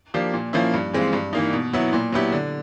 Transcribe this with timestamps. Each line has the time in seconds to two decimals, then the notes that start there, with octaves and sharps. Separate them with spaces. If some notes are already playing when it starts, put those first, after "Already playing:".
0.14 F3 A#3 D4 G4
0.34 A#2
0.53 F3 A#3 C#4 E4
0.74 G2
0.93 E3 G#3 C4 F4
1.13 G2
1.33 E3 G3 A#3 D#4
1.53 B2
1.73 F#3 B3 E4
1.93 A#2
2.12 F#3 B3 E4 G4
2.32 D3